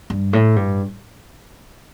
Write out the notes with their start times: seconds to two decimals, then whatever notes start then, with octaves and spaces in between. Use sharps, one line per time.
0.10 G2
0.33 A2
0.56 G2